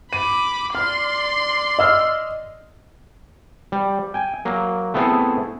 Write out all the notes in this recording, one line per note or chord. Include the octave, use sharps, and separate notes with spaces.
B5 D6 D#7
D5 C6 F6
D#5 E6 F6
G3
G5 G#5
F#3 A#3
A3 B3 C4 E4 G#4 A4